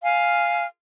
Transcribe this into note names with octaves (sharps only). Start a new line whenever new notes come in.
F5 G#5 F6